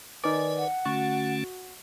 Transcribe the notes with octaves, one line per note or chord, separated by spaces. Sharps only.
D#3 B4 D5 G#5
F#5
D3 A3 C#4 F#4